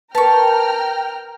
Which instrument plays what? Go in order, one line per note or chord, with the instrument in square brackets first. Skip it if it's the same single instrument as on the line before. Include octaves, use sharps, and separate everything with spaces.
[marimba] A#4 B4 [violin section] G5 A#5 F6 [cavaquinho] A5 C#6